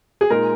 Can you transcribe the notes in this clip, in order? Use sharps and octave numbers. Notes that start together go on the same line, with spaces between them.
G#4
A#2 G#3 D#4 A#4